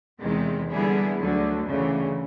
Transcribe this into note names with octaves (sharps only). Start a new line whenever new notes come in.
E2 C3 D#3 G#3 C4
D3 G3 B3 E4 G#4
D2 D3 F#3
D2 C#3 E3